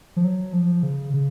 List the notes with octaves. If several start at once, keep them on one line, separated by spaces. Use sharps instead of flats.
F3
F#3
F3
C#3
C#3